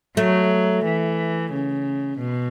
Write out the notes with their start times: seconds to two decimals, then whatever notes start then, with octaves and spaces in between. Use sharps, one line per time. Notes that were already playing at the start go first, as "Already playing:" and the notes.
0.17 F#3 A3
0.84 E3
1.51 C#3
2.18 B2